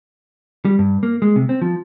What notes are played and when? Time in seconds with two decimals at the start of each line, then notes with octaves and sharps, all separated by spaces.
0.65 G3
0.79 G2
1.03 A#3
1.22 G#3
1.36 C3
1.49 C4
1.61 F3